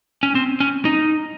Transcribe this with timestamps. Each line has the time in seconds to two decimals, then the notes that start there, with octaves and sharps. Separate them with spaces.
0.23 C#4
0.35 C4
0.60 C#4
0.85 D#4